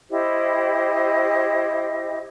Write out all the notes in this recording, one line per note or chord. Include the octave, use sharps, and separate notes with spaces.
E4 G4 C5 D#5